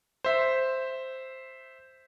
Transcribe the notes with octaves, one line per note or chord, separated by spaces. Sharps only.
C5 E5